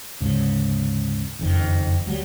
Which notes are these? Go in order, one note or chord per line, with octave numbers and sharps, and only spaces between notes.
D2 G#2 C#3
F#1 F2 D#3
D2 F#3 G3